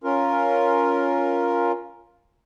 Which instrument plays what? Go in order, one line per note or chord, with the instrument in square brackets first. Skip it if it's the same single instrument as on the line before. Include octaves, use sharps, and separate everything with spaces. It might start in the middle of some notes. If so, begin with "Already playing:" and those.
[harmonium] C#4 F4 A#4